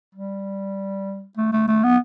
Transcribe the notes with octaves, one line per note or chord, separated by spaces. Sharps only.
G3
A3
A3
A3
B3